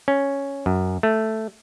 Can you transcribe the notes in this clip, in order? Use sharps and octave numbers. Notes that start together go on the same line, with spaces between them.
C#4
F#2
A3